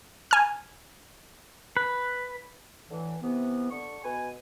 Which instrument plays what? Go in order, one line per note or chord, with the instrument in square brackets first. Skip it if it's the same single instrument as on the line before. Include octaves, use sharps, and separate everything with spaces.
[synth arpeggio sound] G#5 F6
[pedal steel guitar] B4
[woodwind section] A2 D3 E3
C3 E3 B3
D3 C#6
B2 B4 G#5